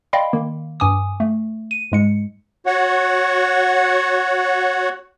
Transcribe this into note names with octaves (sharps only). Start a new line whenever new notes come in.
D5 D#5 F5 G5 B5 C6
D#3 A#3
G2 G#5 D6 D#6
A3
D#7
G#2 G#3 C#7
F#4 C#5 F#5